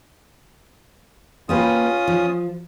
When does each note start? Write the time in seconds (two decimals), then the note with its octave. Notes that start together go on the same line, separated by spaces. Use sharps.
1.49 A#3 C#4 F4 G4 B4 D#6
2.07 F3